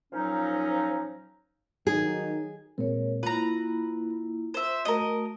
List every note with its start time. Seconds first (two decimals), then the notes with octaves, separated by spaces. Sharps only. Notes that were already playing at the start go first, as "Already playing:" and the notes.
0.13 A#2 F3 F#3 C#4 D#4
1.87 D#3 F#3 D#4 G#4
2.78 A#2 G#3 C4 A#4 C#5
3.23 A#3 E4 F4 B4 A#5
4.54 C5 E5
4.85 A3 F#4 A#4 D#5